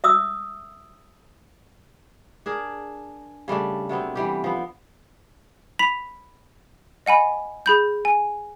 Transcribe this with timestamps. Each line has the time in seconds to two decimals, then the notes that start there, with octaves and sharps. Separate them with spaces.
0.04 E5 D#6 E6
2.46 D4 G#4 A#4
3.48 C#3 G3 A3 D4
3.89 C3 F#3 B3 C4
4.15 E3 G3 G4
4.44 F3 B3
5.79 B5 B6 F7
7.06 D#5 F#5 G#5 B5
7.66 G#4 B5 G6
8.05 G#5